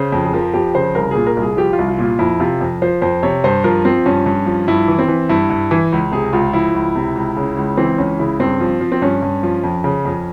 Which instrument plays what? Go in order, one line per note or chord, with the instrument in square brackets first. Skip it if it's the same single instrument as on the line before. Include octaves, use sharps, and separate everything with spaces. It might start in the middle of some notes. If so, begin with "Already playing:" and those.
Already playing: [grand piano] C#3 C5
F2
G#4
F3 A#4
F2 G4
C#3 C5
C2 A#4
A#2 G#4
A#4
C2
G#4
F3 G4
F4
C2
F4
A#2
F4
F2 E4
C3 F4
F2
F3 C5
F2 C5
C3 C#5
G2 C5
F3 A#4
F3 C4
G2 C#4
G2
F3
G2 E4
E3
C4
E3
G2 E4
G2
E3
C#2
C3 G#4
C#2 F4
F3 E4
C#2
C3
C#2
C#3
C#2
E3 C4
C#2 C#4
C#3 E4
G2 C4
F3
F3
C4
G2 C#4
G2
F3
F2
C#3
F2